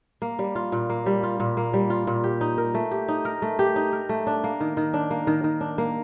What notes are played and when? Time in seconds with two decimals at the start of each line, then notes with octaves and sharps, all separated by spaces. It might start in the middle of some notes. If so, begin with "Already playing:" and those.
0.22 A#3
0.39 G3
0.55 F4
0.72 A#2
0.90 A#3
1.06 G3
1.23 F4
1.40 A#2
1.57 A#3
1.73 G3
1.90 F4
2.07 A#2
2.24 G4
2.41 D#4
2.58 A#4
2.74 A3
2.91 G4
3.08 D#4
3.25 A#4
3.42 A3
3.59 G4
3.76 D#4
3.92 A#4
4.09 A3
4.27 D4
4.44 A#3
4.60 D#3
4.77 D#3
4.94 D4
5.10 A#3
5.27 D#3
5.44 D#3
5.61 D4
5.78 A#3